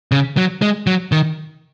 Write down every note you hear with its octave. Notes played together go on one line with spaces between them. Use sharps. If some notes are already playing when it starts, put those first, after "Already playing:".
C#3
F#3
G#3
F#3
D#3